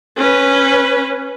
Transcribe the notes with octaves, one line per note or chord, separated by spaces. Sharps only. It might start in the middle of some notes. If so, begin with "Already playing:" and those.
C#4 B4